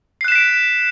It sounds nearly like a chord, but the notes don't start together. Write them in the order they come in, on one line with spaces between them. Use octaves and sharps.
C7 F#6 E7 B6 D7